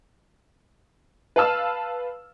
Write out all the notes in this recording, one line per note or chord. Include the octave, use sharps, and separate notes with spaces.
B4 F5 A5 E6 F6